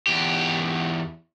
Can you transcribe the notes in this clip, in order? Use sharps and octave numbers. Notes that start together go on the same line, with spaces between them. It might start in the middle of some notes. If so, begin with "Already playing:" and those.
E2 G4